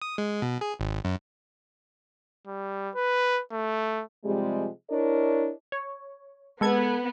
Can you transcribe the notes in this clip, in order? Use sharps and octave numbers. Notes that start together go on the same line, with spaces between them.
D#6
G#3
B2
G#4
G#1
F#2
G3
B4
A3
C3 F3 G3 G#3
D4 E4 A#4 C#5 D#5
C#5
G#3 B3 A4 G#6